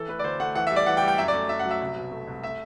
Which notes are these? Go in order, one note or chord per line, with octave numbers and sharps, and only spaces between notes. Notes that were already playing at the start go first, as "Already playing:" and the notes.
Already playing: E3 A4
A3 B4
D5
D2 C5
A3 F#5
E3 F#5
E5
G3
D5
E3 F#5
G5
G3
G5
F#2 E5
D5
A3
F#2 E5
F#5
F#3
E5
C2
B2
A3
C2
A3 E5